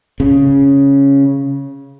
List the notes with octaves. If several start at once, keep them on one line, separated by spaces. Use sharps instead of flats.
C#3